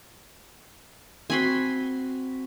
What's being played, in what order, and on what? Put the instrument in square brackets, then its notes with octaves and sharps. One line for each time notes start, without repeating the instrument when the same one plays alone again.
[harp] C4 F#4 [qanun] G#5 B5 C6